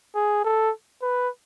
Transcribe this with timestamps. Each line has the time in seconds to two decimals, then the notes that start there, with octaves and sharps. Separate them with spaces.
0.15 G#4
0.44 A4
1.02 B4